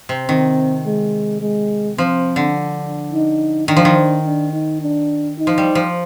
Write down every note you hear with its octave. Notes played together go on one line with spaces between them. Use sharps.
C3
D#3 C4
G#3
G#3
F3 C4
D3
D4
D#4
D#3 D4
F3
D#3
D4
D#4
D4
D#4
F3
G3
F3